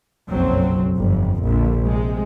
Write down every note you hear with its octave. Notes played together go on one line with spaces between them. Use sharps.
F#1 B1 F2 F#3 C4
G1 F2
A#1 D3
C3 G#3